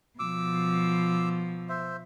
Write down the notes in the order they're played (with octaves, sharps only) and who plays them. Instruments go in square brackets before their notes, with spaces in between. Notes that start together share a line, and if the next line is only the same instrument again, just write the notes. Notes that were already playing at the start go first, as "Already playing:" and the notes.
[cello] B2 F3 [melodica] D6 E6
[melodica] C5 E5